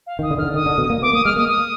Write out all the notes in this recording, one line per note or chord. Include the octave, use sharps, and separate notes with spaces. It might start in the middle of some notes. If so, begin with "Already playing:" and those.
F5
D#3
D#6
D3
D3 D#3 F6
D#3 D#6
D3
B2
A#3
B3 D6
A#3 D#6
G#3 F6
A#3 D#6
D#6